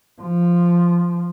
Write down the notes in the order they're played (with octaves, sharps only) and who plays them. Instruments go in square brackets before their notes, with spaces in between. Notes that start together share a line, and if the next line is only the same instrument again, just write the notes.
[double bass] F3